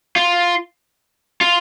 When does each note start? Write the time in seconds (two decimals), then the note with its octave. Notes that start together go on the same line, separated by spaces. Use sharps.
0.16 F4
1.41 F4